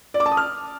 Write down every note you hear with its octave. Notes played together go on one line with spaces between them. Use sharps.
D5
D6
A5
D#6
F6